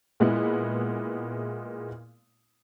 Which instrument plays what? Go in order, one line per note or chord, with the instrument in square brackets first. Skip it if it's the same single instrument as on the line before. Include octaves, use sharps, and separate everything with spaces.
[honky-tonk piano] A#2 G#3 B3 E4